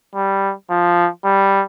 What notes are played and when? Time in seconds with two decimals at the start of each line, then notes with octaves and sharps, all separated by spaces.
0.15 G3
0.70 F3
1.25 G3